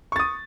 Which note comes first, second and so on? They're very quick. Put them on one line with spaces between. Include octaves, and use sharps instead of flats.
C#6 A6 D#6